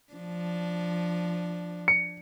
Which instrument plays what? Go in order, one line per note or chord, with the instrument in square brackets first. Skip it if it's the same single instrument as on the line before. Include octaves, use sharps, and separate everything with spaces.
[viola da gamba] F3 D4
[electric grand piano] C#7